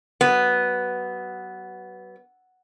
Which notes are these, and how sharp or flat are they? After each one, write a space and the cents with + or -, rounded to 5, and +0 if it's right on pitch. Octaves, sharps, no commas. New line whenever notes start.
F#3 +35 B3 +0